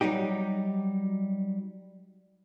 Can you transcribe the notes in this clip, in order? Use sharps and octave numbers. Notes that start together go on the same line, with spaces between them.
F#3 G3 D#4 G4